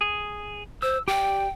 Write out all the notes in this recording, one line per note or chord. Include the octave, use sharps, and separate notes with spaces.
G#4
C5 E6
G4 D5 G5